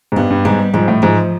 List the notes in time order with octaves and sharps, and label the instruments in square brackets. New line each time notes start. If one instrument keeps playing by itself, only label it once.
[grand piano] G#2
[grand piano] G2 [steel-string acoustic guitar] B3
[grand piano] G2
[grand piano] G#2 [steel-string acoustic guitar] G3
[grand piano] G#2 [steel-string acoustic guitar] F3
[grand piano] A2
[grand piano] G#2 [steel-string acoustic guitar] F3